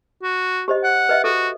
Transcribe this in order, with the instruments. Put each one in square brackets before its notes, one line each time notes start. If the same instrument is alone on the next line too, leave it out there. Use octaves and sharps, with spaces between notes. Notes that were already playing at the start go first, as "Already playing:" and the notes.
[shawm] F#4
[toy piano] G4 C5 D#5
[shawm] F#5
[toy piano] B4 D#5 E5
[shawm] F#4 [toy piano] A4